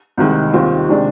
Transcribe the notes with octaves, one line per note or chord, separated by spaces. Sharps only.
C2 C3 D#3 G#3
D#2 D#3 G3 C4 F4
C3 D#3 G#3 D4